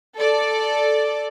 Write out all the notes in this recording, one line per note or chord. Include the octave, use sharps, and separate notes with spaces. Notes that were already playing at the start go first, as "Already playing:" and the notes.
A4 D5